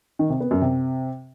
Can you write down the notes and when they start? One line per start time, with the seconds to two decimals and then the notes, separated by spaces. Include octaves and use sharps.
0.19 D#3
0.30 C3
0.40 B3
0.51 F#2
0.62 C3